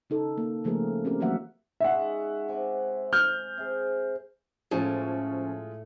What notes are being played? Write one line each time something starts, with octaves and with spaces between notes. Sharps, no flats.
C#3 D#4 A4
A#3
C#3 F3 A3 A#3 G#4 A#4
C4 C#4 G4 A#4
E3 F#3 A3 A#3 E5 F#5
G#3 C#4 D#4 E5 F#5
C3 G#5 D6
F6 G6
C3 G#4
A2 F3 G#3 C#4 F4 G#4